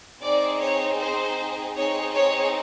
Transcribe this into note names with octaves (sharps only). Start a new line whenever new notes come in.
C4 D#4 G#4 D5
C#5
C5
C4 D#4 G#4 C#5
C#5